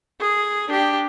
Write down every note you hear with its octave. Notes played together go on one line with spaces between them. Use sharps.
G#4
D4 G4